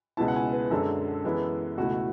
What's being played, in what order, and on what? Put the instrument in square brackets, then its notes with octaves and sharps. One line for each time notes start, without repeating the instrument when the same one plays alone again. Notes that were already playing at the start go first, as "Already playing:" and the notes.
[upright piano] C#2 B2 G#3 B3 E4 A5
F#5
G#5
B4
F#2 D3 G#3 D4 A4
F#2 E3 G#3 B3 E4
C#2 B2 A3 E4 F#4